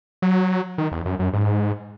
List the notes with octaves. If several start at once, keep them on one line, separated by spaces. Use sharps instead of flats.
F#3
D#3
E2
F#2
F#2
G#2